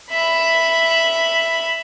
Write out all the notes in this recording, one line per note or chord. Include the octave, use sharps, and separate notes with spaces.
E5 B5